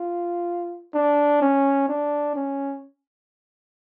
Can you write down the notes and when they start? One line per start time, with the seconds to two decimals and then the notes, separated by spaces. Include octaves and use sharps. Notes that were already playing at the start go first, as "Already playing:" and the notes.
Already playing: F4
0.94 D4
1.42 C#4
1.88 D4
2.36 C#4